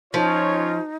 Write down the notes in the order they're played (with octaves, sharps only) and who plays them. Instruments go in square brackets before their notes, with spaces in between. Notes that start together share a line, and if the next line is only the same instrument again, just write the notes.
[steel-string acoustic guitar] F3 [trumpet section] C#4 F4 C#5 [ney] D#4